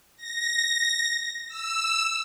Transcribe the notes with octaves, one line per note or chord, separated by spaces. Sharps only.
A#6
E6